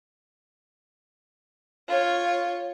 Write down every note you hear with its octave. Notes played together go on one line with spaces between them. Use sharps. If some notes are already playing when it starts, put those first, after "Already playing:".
F4 C#5